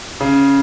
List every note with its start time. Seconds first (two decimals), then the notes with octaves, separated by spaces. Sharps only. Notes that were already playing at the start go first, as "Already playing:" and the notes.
0.21 C#3